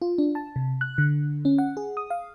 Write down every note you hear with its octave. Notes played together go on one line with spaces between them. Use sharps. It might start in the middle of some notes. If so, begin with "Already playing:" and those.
F4
D4
A5
C3
F#6
D3
C#4
F#5
G#4
D#6
F5